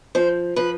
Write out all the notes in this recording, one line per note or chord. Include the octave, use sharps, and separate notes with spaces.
F3 C5
F3 B4